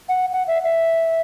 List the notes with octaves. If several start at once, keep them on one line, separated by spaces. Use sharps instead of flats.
F#5
F#5
E5
E5